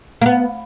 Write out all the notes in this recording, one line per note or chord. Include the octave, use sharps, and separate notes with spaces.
A#3
B3